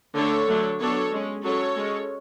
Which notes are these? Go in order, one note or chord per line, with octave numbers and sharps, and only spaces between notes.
D3 A3 D4 A4 C#5
D3 F#3 A3 D4
F#3 B3 D4 A4 C#5
G#3 C#4
F#3 C#4 A4 C#5
G#3 C#4